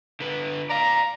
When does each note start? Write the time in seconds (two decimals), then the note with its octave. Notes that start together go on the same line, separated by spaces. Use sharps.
0.20 D3 B4
0.70 D5 F5 A#5